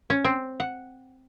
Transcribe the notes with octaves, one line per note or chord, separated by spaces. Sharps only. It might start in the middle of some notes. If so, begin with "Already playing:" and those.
C#4
C4
F#5